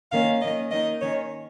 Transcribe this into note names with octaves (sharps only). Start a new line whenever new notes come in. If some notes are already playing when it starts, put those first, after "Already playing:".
D#3 A#3 C#4 F5
D#3 A#3 C#4 D#5
D#3 A#3 D#4 D#5
D#3 C#4 C#5